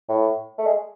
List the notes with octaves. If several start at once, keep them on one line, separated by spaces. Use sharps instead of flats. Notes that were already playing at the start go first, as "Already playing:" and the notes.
A2
A3
G#3